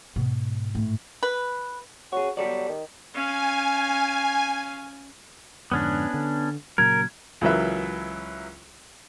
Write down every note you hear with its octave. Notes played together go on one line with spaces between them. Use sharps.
G#2 B2
A2
B4
F#4 G#4 C#5
F#3 G4 A4 D5
D#3
C#4 F5 G#5
F2 G#2 D3 B3 C#4 D4
D3
A#2 C#3 F#3 A#4 G#6
C#2 E3 F#3 A#4 B4 E5